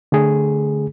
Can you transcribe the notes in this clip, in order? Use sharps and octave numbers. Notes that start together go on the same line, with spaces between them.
D3 A3 G#4